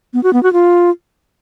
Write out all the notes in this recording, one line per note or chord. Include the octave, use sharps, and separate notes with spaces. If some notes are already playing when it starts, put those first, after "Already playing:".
B3
F#4
B3
F#4
F4